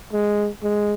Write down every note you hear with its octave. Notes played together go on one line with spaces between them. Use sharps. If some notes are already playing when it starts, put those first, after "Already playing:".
G#3
G#3